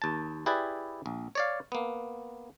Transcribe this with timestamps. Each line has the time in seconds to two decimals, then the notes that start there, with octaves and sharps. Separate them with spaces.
0.02 D#2 A5
0.46 E4 G4 G#4 B4 D5
1.06 A#1
1.35 C#5 D5 F5
1.72 A#3 B3